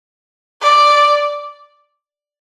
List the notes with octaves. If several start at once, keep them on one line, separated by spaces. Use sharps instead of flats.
D5